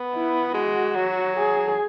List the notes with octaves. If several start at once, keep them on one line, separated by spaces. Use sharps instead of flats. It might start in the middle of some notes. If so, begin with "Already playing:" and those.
Already playing: B3
E4
G#3 F#4
F#3
G#4